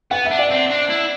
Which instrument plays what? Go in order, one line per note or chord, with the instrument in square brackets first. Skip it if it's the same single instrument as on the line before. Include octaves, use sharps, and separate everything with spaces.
[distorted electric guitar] B3 [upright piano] F#5
[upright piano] E5
[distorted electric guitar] D4
[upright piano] D5 F#5
[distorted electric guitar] C4
D4
E4